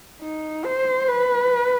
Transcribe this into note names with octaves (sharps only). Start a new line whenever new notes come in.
D#4
C5
B4